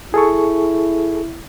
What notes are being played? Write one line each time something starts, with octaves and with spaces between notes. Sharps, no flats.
E4 G#4 A4 C#6